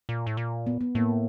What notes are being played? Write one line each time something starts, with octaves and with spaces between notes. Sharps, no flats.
A#2
A2
A#2
B3
B3
A2 A#3